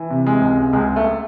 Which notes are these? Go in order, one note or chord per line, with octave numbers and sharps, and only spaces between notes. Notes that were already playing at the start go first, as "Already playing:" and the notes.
Already playing: E3
C3
G#3
C#2
C#2 G#3
A3